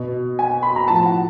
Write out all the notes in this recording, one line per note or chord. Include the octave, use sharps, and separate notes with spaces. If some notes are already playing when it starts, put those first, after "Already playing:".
Already playing: B2
G#5
B5
A#5
A2 F3 A5
F#5